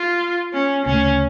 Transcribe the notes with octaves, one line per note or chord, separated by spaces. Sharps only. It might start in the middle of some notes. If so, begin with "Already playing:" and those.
Already playing: F4
C#4
D2 C#3 E3 A3 C#4